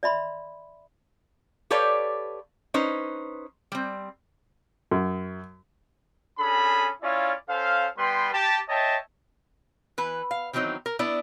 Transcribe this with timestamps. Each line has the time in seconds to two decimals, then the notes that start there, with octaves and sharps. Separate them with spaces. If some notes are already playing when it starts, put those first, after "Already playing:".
0.03 D5 E5 B5 C6
1.70 G4 A4 B4 C#5 D5 F5
2.74 C#4 D#4 B4 C5
3.72 G3 C4
4.91 F#2
6.39 C#4 D4 G#4 A4 B5
7.03 C#4 E4 F4 C#5 D5 F5
7.49 C#4 A4 C5 F5
7.97 G3 B3 B4 G5 C6
8.32 G4 A5
8.69 C#5 D#5 E5 G5 A5
9.98 E3 B4
10.31 F5
10.53 D#3 E3 F#3 C4 D#4
10.86 A#4
10.99 B3 D4 E4 D5